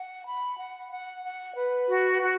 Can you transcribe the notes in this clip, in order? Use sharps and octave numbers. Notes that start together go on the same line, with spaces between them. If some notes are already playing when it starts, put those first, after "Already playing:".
Already playing: F#5
B5
F#5
F#5
F#5
B4
F#4
F#4